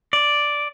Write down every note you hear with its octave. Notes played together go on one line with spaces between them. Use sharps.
D5